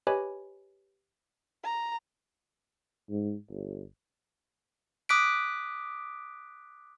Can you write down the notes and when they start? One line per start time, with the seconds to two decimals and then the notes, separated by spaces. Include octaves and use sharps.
0.07 G4 B4 C#5 D#5 G#5 B5
1.63 A#5
3.10 G#2
3.50 G1
5.09 D6 D#6 F#6 B6 D7